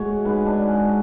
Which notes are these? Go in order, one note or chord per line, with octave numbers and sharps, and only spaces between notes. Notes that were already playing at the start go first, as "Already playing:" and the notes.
Already playing: A2 G#3 F#4 C#5
G#2 G#3 B4
D4
C#4